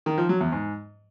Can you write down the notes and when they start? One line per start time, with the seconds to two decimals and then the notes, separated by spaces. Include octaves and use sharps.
0.06 D#3
0.18 F3
0.29 F#3
0.41 E2
0.52 G#2